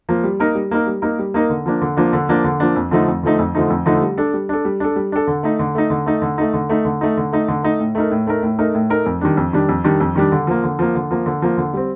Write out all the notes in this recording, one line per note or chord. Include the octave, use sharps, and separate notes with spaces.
F3 A#3
G3
A#3 D#4 A#4
G3
A#3 D#4 A#4
G3
A#3 D#4 A#4
G3
A#3 D#4 A#4
D3
F3 A#3 D4
D3
F3 A#3 D4
D3
F3 A#3 D4
D3
F3 A#3 D4
F2
D3 F3 A3 D#4
F2
D3 F3 A3 D#4
F2
D3 F3 A3 D#4
F2
D3 F3 A3 D#4
G3
D4 A4
G3
D4 A4
G3
D4 A4
G3
D4 A4
D3
A3 D#4
D3
A3 D#4
D3
A3 D#4
D3
A3 D#4
D3
A3 D#4
D3
A3 D#4
D3
A3 D#4
D3
A3 D#4
A2
A3 D#4 A#4
A2
A3 D#4 A#4
A2
A3 D#4 A#4
A2
A3 D#4 A#4
F2
D#3 G3 D4
F2
D#3 G3 D4
F2
D#3 G3 D4
F2
D#3 G3 D4
D3
F3 A#3
D3
F3 A#3
D3
F3 A#3
D3
F3 A#3
D3
G3 C4